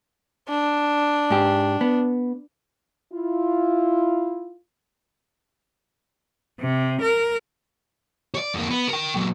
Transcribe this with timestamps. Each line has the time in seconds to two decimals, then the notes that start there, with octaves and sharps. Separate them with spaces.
0.49 D4
1.31 G#2 G4
1.81 B3
3.12 E4 F4
6.62 C3
7.02 A#4
8.35 C#5 D5
8.55 F2 A#3
8.71 B3
8.89 A#4 G5
9.14 A#2 F#3